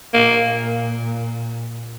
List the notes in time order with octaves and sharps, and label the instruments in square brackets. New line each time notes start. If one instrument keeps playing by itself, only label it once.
[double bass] A#2 [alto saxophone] A#3